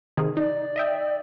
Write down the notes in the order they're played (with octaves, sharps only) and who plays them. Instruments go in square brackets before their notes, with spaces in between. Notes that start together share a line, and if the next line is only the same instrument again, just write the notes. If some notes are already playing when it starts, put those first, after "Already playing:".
[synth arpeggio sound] C3 D#3 G#4
[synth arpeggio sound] D#4 [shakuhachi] D5
[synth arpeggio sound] D#5 E5 G5